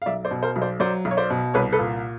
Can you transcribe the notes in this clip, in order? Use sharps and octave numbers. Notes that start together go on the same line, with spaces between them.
F5
B1 D5 E5
C5 D5
B2
A#4 C5
B1
C5 D5
F#3 C5 D5
B1
C#5
C5 D5
B2
C2 B4 C#5
A4 B4
A#2